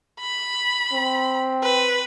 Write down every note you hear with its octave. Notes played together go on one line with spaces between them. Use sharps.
B5
C4
B4